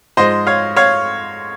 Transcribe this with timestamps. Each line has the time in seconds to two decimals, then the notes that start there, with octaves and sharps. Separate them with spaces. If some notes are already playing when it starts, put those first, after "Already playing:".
0.17 G#2 F3 G#3 C5 D#5
0.47 C#5 F5
0.77 C#5 F5